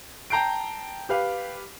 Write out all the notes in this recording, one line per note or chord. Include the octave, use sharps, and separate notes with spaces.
G5 A5 A#5 G6 C7 D7
G4 B4 F5